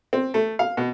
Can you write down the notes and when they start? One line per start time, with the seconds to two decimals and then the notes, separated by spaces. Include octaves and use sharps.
0.13 C4
0.34 A3
0.59 F5
0.77 B2